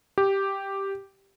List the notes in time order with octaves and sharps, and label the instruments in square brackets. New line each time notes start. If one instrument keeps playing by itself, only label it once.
[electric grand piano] G4